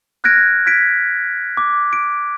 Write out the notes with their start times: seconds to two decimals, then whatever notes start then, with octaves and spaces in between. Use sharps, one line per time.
0.24 F6 F#6 G#6 A#6 D7
0.66 F6 G#6 B6 D7
1.57 D6
1.93 D7